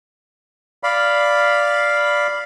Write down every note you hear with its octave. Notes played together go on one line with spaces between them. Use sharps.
D5 F5 B5